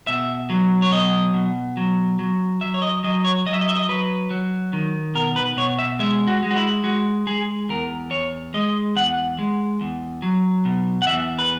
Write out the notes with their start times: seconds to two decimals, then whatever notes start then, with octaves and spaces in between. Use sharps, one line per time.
0.07 B2 E5
0.50 F#3
0.82 C#5
0.91 B2 D#5
1.34 B2
1.77 F#3
2.19 F#3
2.61 F#3 E5
2.74 C#5
2.82 D#5
3.04 F#3 D#5
3.25 C#5
3.46 F#3 D#5
3.53 E5
3.61 D#5
3.69 E5
3.76 D#5
3.89 F#3 B4
4.31 F#3
4.73 D#3
5.15 B2 A#4
5.36 B4
5.57 B2 C#5
5.79 E5
5.99 G#3 E5
6.27 F#4
6.43 G#3
6.51 F#4
6.56 E4
6.84 G#3 F#4
7.27 G#3 G#4
7.69 E2 A#4
8.11 E2 C#5
8.54 G#3 D#5
8.96 E2 F#5
9.39 G#3
9.81 E2
10.22 F#3
10.65 B2
11.02 F#5
11.07 E2 E5
11.39 B4